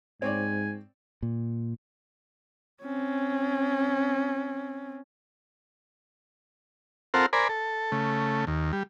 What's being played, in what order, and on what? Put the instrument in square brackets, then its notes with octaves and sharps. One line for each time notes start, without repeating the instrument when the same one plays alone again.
[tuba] G#2 [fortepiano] C4 C#5 D5 [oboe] G#5
[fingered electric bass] A#2
[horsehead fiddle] C4 C#4
[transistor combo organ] C4 F4 A4 A#4 C5 F#5
A#4 C5 D5 G#5 B5
A4
C#3 A3
D#2
G3